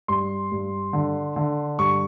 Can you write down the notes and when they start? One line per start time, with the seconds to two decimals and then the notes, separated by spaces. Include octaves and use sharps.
0.08 G2 C6
0.52 G2
0.93 D3
1.36 D3
1.78 G2 C#6